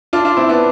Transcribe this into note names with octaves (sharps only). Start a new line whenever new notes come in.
D4 F4
D4 F4
C4 E4
B3 D4